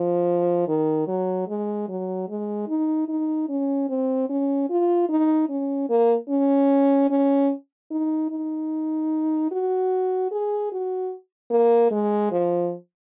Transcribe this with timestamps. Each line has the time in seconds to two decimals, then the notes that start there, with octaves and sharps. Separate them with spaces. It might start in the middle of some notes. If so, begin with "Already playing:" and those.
Already playing: F3
0.68 D#3
1.08 F#3
1.48 G#3
1.89 F#3
2.29 G#3
2.68 D#4
3.08 D#4
3.49 C#4
3.89 C4
4.29 C#4
4.70 F4
5.09 D#4
5.50 C#4
5.90 A#3
6.29 C#4
7.10 C#4
7.91 D#4
8.31 D#4
9.51 F#4
10.31 G#4
10.72 F#4
11.51 A#3
11.91 G#3
12.32 F3